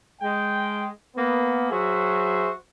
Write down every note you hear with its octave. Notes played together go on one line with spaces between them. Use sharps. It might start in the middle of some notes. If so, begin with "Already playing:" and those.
G#3 G5
A#3 B3
F#3 F#4 G#4 C5 E5